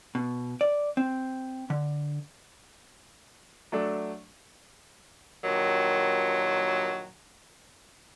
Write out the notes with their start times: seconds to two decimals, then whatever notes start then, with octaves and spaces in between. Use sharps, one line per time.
0.15 B2
0.61 D5
0.97 C4
1.70 D3
3.72 F#3 A3 D4 A4
5.44 G2 A#2 D#3 F#3